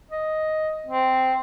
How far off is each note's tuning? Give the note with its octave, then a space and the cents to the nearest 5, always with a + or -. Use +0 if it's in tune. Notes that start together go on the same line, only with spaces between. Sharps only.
D#5 +5
C4 -10